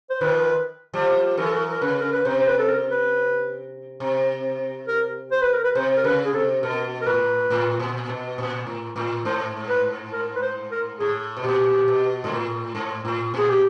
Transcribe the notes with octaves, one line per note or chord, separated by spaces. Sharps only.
C5
D#3 F3 B4
F3 G3
E3 F#3 A#4
A4
A#4
A#4
C#3 B4
A#4
B4
C3 C5
C5
B4
A4
A#4
B4
C3
A#4
C5
B4
A#4
B4
C3 C5
A#4
C#3 B4
G#4
C3 A4
B2 A#4
A#4
A2 B4
A2
A#2
B2
A#2
A2
A2
G#2 C5
B4
A#4
B4
C5
A#4
A2 G#4
B2
A#2 G4
B2
G#2
A2
G#2
A2
A#2 G#4
G4